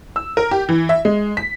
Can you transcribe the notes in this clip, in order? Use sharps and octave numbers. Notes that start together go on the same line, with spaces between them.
E6
A#4
G4
E3
E5
G#3
B6